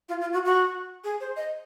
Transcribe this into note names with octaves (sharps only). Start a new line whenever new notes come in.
F4
F4
F#4
F#4
G#4
C5
D#5